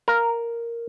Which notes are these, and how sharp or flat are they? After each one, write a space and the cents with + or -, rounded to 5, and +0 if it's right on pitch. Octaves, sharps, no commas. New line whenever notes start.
A#4 +0 F5 +0